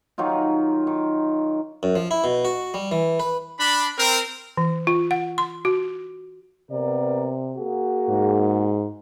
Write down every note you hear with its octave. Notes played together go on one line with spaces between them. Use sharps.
D#3 F#3 D#4 F4
D#3
F#2
F3
E4
B2
F#4
G3
E3
B4
D4 B5
C4 A#4
E3
F4
F#5
C6
F#4
C3 B3 A#4 D5
A#3 F#4 G#4
G#2